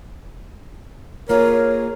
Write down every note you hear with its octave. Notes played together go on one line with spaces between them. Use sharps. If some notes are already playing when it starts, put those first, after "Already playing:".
A#3 F4 G#4 A#4 C#5